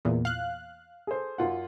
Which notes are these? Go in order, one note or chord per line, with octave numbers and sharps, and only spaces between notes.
E2 A#2
F5 F#6
G#4 A4 C5
F#2 F4 F#5